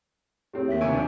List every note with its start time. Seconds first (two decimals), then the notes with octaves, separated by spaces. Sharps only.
0.53 A2 C4 G4 G#4 C#5
0.68 D#2 E5 B6
0.81 G#2 C3 G#5 C#6 E6 D7
0.93 F3 D4